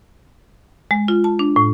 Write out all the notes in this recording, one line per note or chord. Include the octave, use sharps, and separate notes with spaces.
G#3
F4
A5
D4
A2